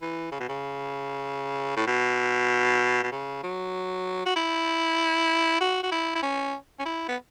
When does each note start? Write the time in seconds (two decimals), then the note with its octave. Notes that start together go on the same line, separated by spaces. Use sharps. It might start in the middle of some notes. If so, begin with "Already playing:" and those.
0.02 E3
0.32 C#3
0.40 B2
0.49 C#3
1.77 A2
1.87 B2
3.03 B2
3.12 C#3
3.43 F#3
4.26 F#4
4.36 E4
5.61 F#4
5.83 F#4
5.92 E4
6.15 E4
6.23 C#4
6.80 C#4
6.85 E4
7.08 B3